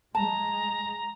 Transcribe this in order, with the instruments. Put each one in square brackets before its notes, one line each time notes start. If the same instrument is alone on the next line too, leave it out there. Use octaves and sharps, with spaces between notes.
[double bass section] G#3 [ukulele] A5 [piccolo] A#5